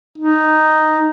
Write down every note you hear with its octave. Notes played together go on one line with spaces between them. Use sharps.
D#4